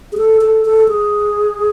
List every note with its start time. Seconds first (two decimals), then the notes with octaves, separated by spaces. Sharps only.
0.12 G#4
0.17 A4
0.41 A4
0.65 A4
0.88 G#4